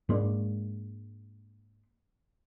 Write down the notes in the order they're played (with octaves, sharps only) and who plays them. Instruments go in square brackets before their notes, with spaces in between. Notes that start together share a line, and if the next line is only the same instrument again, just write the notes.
[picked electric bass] G#2 G#3 A#3 D4